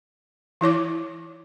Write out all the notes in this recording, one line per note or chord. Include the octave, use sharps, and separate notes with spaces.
E3 E4 C#5 D6